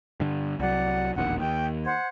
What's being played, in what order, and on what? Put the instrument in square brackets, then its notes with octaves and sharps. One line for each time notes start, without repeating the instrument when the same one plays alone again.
[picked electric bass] G2 D3
[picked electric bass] C2 F#3 [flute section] D5 F#5
[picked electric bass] E1 A#1 D#2 [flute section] F#5
[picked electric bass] D#2 [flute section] G5
[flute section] C5 F#5 G#6